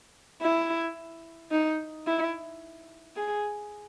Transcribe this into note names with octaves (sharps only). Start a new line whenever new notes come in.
E4
D#4
E4
G#4